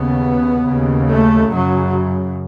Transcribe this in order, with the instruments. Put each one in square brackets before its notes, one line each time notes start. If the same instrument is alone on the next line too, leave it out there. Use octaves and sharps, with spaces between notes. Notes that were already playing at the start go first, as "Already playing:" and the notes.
Already playing: [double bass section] D#2 C#3 B3
D#2 C#3
A3
F#2 C#3 F#3